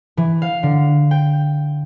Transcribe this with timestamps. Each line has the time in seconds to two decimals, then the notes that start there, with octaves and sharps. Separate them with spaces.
0.17 E3
0.42 F5
0.63 D3
1.11 G5